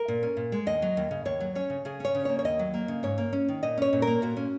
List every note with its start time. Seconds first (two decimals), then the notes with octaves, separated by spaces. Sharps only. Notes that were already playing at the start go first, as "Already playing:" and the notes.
Already playing: A#4
0.08 A#2
0.23 C#4
0.37 A#2
0.52 G#3
0.67 D#2 D#5
0.82 F#3
0.97 D#2
1.11 C#3
1.25 D#2 C#5
1.40 F#3
1.55 C#4 C#5
1.70 C#3
1.85 C#3 G#4
2.00 C#4 C#5
2.15 C#3
2.25 A#3 C#5
2.39 C#5
2.45 D#2 D#5
2.59 F#3
2.74 A#3
2.88 C#3
3.03 G#2 C#5
3.18 A#3
3.33 C#4
3.49 D#3
3.63 A#2 D#5
3.78 C#4 C#5
3.93 A#2
4.02 A#4
4.07 A#3
4.22 A#2 F#4
4.37 C#4